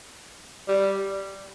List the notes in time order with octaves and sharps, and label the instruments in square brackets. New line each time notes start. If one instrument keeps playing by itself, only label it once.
[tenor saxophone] G3